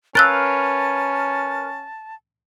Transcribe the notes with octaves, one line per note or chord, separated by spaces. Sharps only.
C#4 A#4 B4 F5 A5 E6 F#6 A6